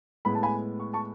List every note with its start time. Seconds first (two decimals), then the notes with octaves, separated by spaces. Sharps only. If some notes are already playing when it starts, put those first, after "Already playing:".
0.25 A2 G#3 B3 B5
0.35 A5
0.43 G#5 B5
0.80 C#6
0.93 A5 C#6